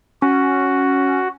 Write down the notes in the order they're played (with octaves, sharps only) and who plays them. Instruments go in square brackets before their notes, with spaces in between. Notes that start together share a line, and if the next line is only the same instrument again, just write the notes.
[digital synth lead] C#4 [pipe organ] F#4